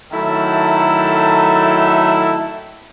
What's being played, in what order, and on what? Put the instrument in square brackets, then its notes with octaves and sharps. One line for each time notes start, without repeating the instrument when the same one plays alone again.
[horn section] D#3 F#3 A3 E4 A4